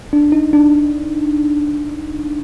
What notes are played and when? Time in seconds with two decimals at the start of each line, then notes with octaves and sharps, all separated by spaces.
0.13 D4
0.32 D#4
0.53 D4